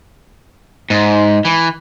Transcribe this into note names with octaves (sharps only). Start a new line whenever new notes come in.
G#2
E3